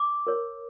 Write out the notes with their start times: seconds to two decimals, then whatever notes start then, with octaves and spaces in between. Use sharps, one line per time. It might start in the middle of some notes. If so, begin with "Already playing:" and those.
Already playing: D6
0.27 A#4 C#5